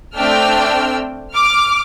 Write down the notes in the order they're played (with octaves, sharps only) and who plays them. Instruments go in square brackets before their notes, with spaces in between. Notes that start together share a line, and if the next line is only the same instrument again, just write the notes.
[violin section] A3 C4 D4 G5 E6 F6
D6 F6